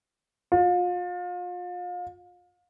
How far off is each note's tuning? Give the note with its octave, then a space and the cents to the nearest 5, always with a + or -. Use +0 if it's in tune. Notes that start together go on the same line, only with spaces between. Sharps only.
F4 +35